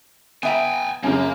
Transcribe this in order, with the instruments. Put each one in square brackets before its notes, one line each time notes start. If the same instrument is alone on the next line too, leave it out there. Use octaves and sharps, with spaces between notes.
[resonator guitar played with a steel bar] B3 E5 A#5 [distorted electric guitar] G5 G#5
[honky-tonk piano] F#2 C#3 [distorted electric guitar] A#3